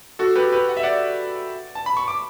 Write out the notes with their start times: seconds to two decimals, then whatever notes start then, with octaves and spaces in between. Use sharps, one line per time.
0.19 F#4 A4
0.35 G4 B4
0.52 G4 B4
0.69 F#5
0.77 E5
0.83 D5 F#5
1.75 A5
1.86 B5
1.97 C#6
2.08 D6